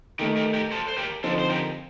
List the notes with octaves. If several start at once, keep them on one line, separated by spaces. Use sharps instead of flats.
D#3 A3 D#4 G4 A#4
G4 A#4
G4 A#4
A4 C5
C5
G4 A#4
D3 F3 C4 D#4 A4 C5
C5
G4 A#4